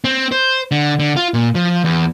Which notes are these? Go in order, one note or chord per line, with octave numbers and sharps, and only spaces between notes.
C4
C5
D3
D3
F4
A#2
F3
E2